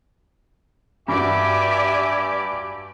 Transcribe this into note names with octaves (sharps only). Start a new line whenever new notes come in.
G2 F#4 G4 D5 E5 G#5 D6